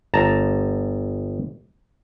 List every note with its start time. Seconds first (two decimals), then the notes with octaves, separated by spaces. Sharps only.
0.14 G1 A5 A#5